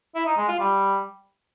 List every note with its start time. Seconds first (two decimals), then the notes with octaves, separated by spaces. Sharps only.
0.15 E4
0.26 D#4
0.37 G#3
0.48 F4
0.60 G3